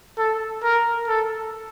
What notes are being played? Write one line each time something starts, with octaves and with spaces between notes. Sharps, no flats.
A4
A#4
A4